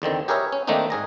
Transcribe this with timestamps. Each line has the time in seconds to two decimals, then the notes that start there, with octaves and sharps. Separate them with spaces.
0.02 E2 D3 D#3 C4
0.28 G4 G#4 A#4 B4 C#5 E5
0.52 C#4
0.67 D#3 A3 A#3 C4 D4 D#4
0.90 G#2 G#4 A#5